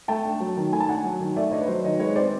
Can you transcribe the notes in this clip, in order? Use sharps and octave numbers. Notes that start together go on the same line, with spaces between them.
A3 G5 A5
D4
F#3
D#3
A3 G#5
A5
D4 F#5 G#5
F#3
D#3
A3 D5 E5
D4 C#5 D#5
B4
F#3 C5
D#3 C#5 D#5
G#3 B4 C#5
C4 C5 D5